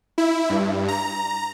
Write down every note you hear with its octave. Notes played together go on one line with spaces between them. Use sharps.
E4
G2
A#5